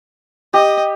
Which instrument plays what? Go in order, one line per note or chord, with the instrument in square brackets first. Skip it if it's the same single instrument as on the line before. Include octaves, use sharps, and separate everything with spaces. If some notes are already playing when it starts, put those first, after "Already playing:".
[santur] G4 [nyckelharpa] D#5